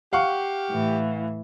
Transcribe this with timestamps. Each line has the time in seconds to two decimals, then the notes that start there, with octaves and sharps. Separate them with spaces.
0.13 G4 F5 F#5 C#6
0.70 A2 E3